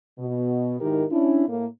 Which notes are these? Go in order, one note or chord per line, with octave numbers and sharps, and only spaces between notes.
B2
G#2 D#3 D#4 E4 G4 A#4
C#4 D4 E4
A2 A#3